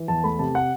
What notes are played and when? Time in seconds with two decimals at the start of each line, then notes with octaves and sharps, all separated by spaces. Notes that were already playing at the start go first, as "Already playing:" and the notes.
Already playing: E3
0.08 E2 A5
0.24 A3 B5
0.39 C3 A5
0.55 F#5